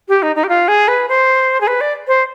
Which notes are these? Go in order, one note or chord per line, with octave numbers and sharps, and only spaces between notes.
G4
D#4
D#4
G4
F4
G#4
B4
C5
G#4
B4
D5
C5